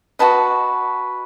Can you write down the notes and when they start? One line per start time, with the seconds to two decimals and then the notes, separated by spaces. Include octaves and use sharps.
0.19 F#4 B4 D#5 A5